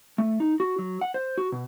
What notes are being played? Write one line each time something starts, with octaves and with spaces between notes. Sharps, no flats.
A3
D#4
F#4
F#3
F#5
C5
F#4
B2